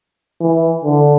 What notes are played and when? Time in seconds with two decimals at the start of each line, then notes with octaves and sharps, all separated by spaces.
0.41 E3
0.84 D3